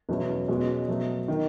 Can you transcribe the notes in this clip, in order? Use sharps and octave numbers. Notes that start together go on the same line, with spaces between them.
E2 B2 F#3 A3 C#4
B2 G#3 C#4 F#4
B2 F#3 A3
D#3